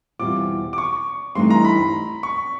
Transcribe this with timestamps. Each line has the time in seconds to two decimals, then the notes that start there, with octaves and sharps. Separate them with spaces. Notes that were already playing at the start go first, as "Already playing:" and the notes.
0.19 E2 B2 G3 C4 F4 D6
0.73 D6
0.78 C#6
1.35 G2 E3 A3 C4 D#4 C6
1.50 A#5
1.65 B5
2.23 C#6